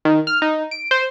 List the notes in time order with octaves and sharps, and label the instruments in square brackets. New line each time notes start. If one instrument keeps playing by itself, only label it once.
[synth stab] D#3
F6
D#4
D7
C5